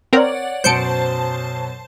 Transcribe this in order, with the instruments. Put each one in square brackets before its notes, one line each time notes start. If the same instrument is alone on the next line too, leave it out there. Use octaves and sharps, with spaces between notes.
[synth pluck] C4 A#4 [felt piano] C#5 [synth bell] D5 F#5
[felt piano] F#2 B2 F#3 [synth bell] C5 A5 [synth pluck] G6 C#7 D7